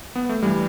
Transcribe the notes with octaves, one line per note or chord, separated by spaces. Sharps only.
B3
A3
G2 E3 G3